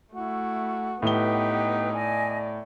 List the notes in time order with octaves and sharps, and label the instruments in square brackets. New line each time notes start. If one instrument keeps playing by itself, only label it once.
[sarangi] A3 [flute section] E4 [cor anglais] F#4
[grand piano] A2 G7 [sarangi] B3 [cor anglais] D#4 [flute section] G4 B4 G5
[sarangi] D5 [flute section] D#5 G#5